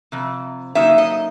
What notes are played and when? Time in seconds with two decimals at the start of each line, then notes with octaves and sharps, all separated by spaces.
0.12 F2 C3
0.75 C#3 F#3 A#3 D#4 E5
0.98 D#5